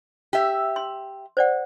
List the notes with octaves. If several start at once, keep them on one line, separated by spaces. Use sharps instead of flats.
G4 E5
C6
C5 D5 F#5